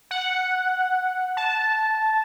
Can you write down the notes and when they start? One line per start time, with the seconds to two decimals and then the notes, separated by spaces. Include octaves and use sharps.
0.11 F#5
1.37 A5